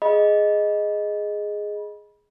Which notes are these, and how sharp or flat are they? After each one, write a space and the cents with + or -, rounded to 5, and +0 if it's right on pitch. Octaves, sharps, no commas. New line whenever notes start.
G#4 +5 D#5 +0 B5 -25